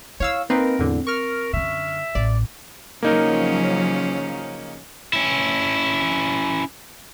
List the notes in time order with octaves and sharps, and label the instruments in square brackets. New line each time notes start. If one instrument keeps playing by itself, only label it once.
[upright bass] E4 [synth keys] C#5 F5 E6
[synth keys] A#3 D#4 B4 [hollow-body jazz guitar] C4 [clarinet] A#4
[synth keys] E2 A2 D3
[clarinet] A#4 [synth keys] C#6 F6
[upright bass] F#2 D3 [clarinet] E5
[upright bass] A1 [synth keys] D5
[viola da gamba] C#3 C#4 [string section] F3 F#3 [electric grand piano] A#3 D#4 A#4
[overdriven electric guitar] C#4 E4